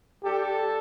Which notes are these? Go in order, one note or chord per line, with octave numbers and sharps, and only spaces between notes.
G3 D4 G4 A4